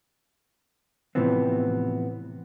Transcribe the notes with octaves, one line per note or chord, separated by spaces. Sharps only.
A2 C3 E3 F3 B3 C4